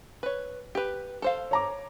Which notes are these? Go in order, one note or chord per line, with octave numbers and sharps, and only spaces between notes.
B4 C#5
G4 B4
A4 C5 F5
C#5 A#5 D6